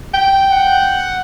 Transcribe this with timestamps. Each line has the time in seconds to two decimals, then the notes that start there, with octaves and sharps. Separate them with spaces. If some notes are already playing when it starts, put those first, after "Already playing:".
0.14 G5
0.52 F#5